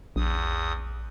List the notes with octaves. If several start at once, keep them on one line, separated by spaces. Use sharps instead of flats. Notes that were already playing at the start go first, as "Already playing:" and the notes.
A#1 E2 D#6